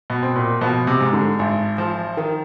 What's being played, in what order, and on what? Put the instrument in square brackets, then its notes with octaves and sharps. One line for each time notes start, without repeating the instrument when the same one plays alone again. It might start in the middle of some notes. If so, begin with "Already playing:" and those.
[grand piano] B2
[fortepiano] C4
[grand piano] A#2
[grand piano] B2 [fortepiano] F3
[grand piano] C3
[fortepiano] G#2
[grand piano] D3
[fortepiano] G#1
F3
D#3